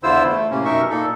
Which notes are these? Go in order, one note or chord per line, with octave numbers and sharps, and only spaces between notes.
E2 D3 E4 F4 C5 E6
A3
A2 C3 A#3 C#4
F#2 B2 D#4 A#4 E5 C#6
A#2 A#3 D#4 A4